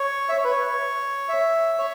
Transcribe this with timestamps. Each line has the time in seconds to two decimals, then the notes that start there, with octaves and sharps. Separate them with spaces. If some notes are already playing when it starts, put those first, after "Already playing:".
Already playing: C#5
0.29 E5
0.37 C#5
0.44 B4
0.51 C#5
1.29 E5
1.78 C#5